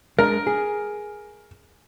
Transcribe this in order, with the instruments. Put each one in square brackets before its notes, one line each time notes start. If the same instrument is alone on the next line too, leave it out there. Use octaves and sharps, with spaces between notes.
[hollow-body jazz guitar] G#3 D4 [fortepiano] A#4
[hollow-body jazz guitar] G#4